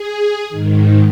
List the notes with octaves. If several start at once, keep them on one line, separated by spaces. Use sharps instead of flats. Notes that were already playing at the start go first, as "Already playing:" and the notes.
Already playing: G#4
G#2 D#3